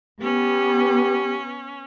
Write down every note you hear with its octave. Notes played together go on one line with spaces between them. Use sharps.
B3 C#4 G4